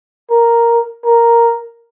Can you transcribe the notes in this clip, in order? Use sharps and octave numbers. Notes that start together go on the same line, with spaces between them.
A#4
A#4